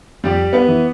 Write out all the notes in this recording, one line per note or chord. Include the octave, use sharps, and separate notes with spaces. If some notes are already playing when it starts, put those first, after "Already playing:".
F2 G3 G4
B3 B4
E3